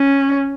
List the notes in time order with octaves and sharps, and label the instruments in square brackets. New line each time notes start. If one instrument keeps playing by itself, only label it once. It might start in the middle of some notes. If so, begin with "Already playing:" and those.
Already playing: [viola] C#4